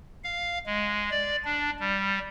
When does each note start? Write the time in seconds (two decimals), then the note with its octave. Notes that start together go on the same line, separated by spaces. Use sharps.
0.24 F5
0.66 G#3
1.11 D5
1.45 D4
1.80 G3